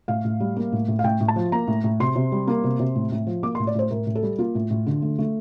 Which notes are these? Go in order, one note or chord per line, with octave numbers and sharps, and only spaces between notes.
A2 F5
A2
G3
A#3
A2
A2
F5
A2 G5
A2
A5
F3
A#3 A#5
A2
A2
C3 C6
C3
G3
A#3
C3
C3
A2
A2
F3
A#3 D6
C6
A2
D5
A2 C5
A2 A#4
A2
A4
G3
A#3 F4
A2
A2
D3
A3
A3